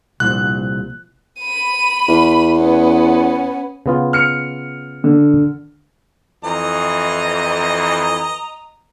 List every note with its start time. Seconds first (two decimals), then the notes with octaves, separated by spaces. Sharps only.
0.20 C2 A#2 F3 F#6
1.41 B5 D#7
2.08 E2
2.56 B3 C#4
3.86 C#3 B3 F4
4.13 F6 C#7
5.04 D3
6.44 F2 E3 D#5 A#5